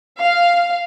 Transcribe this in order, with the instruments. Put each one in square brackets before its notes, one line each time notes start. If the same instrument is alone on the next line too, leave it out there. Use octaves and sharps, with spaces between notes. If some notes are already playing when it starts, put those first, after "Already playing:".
[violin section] F5